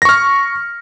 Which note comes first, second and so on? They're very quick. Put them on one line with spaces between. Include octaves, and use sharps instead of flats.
A#6 C#6 F6